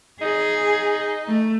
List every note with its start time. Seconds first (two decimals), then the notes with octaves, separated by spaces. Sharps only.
0.21 D#4 G#4
1.28 A3